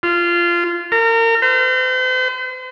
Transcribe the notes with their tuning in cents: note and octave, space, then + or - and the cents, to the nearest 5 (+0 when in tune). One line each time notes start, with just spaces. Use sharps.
F4 -15
A#4 -30
C5 -40